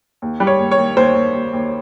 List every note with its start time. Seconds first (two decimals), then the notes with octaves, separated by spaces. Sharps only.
0.22 D#2
0.40 G3
0.47 C#5
0.59 D#2
0.71 C#5
0.78 D#2
0.97 D#2 C5
1.15 D#2
1.34 D#2
1.53 D#2